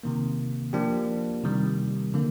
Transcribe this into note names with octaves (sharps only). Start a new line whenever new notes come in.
C3 D#3 A#3
F3 A#3 D4 G4
C3 D#3 G3
D3 F3 A#3